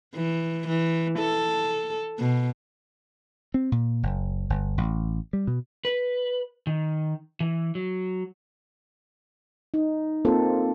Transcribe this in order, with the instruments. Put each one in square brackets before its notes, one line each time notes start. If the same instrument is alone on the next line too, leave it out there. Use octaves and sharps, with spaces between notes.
[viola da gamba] E3
E3
A4
B2
[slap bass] C4
A#2
F#1
G1
A1
G3
B2
[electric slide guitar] B4
D#3
E3
F#3
[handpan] D#4
A#3 C4 F4 A4